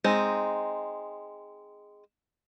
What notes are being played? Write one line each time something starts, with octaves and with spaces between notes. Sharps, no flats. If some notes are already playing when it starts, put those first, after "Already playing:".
G#3 C4 D#4